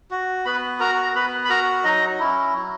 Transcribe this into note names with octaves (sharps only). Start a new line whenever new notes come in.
F#4
B3 B4 B5
F#4 A#4 A#5
A#5
B3 B4 B5
B5
F#4 A#4 A#5
F#3 D#4 D#5
C#4 E4
F#3